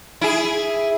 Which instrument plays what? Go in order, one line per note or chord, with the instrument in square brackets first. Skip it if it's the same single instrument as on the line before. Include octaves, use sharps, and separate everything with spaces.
[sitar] E4 G#4